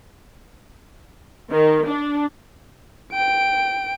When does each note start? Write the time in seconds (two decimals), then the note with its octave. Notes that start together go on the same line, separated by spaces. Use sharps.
1.52 D#3
1.87 D4
3.13 G5 D7